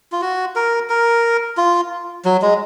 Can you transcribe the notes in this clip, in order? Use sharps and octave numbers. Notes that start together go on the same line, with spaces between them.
F4
F#4
A#4
A#4
F4
F#3
G#3